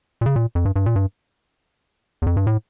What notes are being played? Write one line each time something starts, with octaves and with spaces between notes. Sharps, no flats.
A#2
C#3
A#2
F2
G2
G2
A#2
G2
E2
F2
G2
A2